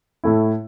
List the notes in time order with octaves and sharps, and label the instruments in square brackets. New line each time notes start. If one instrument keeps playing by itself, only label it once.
[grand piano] A2 A3 E4